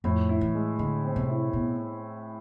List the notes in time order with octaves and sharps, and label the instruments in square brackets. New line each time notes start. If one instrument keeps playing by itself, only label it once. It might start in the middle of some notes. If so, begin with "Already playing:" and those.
[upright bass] F2 [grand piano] A2
[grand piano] E4
[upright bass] E3
[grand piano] G#3
[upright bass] D3 [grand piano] G#3
[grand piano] C4
[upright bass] C3
[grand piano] E4
[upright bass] B2